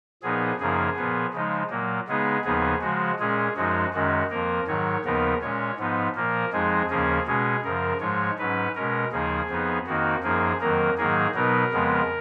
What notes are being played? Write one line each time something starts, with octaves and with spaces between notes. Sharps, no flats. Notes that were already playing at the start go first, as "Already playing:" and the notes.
A#2 F3 B3 D#4 G#4
F#2 C#3 F3 A#3 D#4 G#4
A#2 F3 B3
C#3 F3 G#3 D#4
A#2 F#3 A#3
C#3 G#3 B3 D#4 G#4
D#2 C#3 F3 B3 D#4 G#4
C#3 F3 G#3 F#4
A#2 G#3 C#4 G#4
F#2 F3 G#3 D#4 F#4
F#2 D#3 G#3 C#4 F#4
F2 F3 A#3 A#4
G#2 D#3 F#3 C#5
D#2 C#3 F3 B3 D#4 A#4
A#2 G#3 C#4 C#5
G#2 F3 B3 D#4
A#2 F3 A#3 A#4
F2 F3 G#3 D#4 G#4
D#2 C#3 F3 A#3 C#4 G#4
B2 G#3 C#4 G#4
F#2 C#3 F3 A#4
G#2 F3 G#3 C#5
G#2 F#3 C#4 B4
B2 G#3 C#4 A#4
D#2 C#3 F3 A#3 D#4 G#4
F2 F3 B3 D#4
F2 D#3 A#3 D#4 F#4
F#2 F3 A#3 D#4 G#4
F2 D#3 F#3 A#3 A#4
G#2 D#3 F#3 A#3 D#4 G#4
B2 F#3 B3 D#4 A#4
F2 C#3 F3 G#3 B3